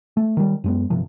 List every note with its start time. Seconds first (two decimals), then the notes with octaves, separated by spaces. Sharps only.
0.17 A3
0.37 D#3 G3
0.64 F#2 G#3 B3
0.90 G1 C3 F3